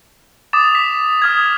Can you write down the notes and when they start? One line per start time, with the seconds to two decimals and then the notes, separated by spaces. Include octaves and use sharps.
0.53 D6 D#6 A6 E7
0.75 B6
1.22 D#6 F6 G#6